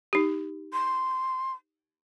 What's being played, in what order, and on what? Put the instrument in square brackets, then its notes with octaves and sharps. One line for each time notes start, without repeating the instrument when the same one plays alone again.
[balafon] D#4 G4
[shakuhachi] C6